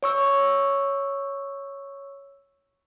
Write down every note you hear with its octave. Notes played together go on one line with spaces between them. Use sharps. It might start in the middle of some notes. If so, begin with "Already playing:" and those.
C#5 C#6 E6